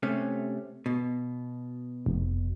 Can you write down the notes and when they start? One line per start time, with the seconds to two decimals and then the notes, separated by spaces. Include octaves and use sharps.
0.03 C3 A3 C#4
0.86 B2
2.06 F1